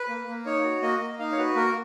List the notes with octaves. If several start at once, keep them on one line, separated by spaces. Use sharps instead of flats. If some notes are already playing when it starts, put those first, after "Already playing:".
Already playing: B4
A#3
A#3
D#4 C#5
F#4
A#3 D#5
A#3
D#4 F5
C#5
F#4 B4
A#3 A#4